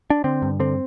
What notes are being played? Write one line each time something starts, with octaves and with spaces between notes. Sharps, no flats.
D4
D3 C4
G2
D3 C4